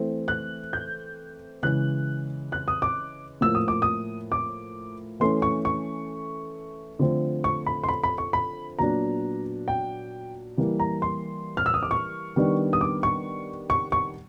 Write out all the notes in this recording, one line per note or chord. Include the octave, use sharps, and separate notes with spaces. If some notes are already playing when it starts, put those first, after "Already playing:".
Already playing: E3 A3 C4
F#6
G6
C#3 E3 G#3 F#6
F#6
D#6
D6
A2 F3 A#3 E6
D#6
D6
D#6
D6
E3 A3 C#4 C6
C#6
C#6
D3 F3 A3 C4
C#6
B5
C6
B5
B5
C#6
B5
A#2 F#3 B3 D4 A#5
G5
E3 G3 A#3
A#5
C6
F6
E6
D#6
D6
C#6
D#3 G3 B3 D4
D#6
D6
C#6
C#6
C#6